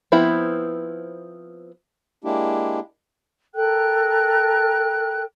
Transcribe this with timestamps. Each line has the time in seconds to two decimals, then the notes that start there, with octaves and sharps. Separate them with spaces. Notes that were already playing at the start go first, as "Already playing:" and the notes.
0.12 F3 B3 C4 E4 B5
2.24 G#3 A#3 D4 E4 G4
3.54 A4 A#4 G5 F#6